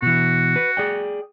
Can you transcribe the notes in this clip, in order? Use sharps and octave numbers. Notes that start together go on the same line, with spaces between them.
B2 E3 F#4
B4
G#4 D5 G5